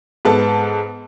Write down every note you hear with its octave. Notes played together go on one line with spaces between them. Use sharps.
G#2 B3 A4 A5